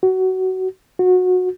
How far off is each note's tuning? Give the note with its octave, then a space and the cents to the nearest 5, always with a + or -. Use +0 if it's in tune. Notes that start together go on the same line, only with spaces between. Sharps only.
F#4 +20
F#4 -20